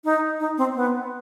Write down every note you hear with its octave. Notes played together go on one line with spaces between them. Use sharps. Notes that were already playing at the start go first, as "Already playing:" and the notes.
D#4
D#4
C4
B3